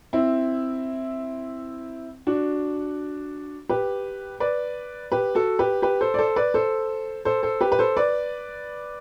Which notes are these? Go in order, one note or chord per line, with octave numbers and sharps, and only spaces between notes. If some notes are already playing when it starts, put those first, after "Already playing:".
C4 E4
D4 F#4
G4 B4
B4 D5
G4 B4
F#4 A4
G4 B4
G4 B4
A4 C5
D5
A4 C5
B4 D5
A4 C5
A4 C5
A4 C5
G4 B4
B4
A4 C5
B4 D5